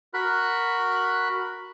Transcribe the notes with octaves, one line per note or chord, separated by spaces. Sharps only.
F#4 A#4 B5 F#6